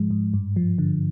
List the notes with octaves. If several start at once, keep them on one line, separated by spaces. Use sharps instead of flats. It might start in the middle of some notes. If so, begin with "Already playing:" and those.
Already playing: G#2 F3 G#3
G#2
G2
F3
D3